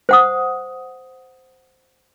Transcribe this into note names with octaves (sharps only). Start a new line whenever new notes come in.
C5 F#5 D#6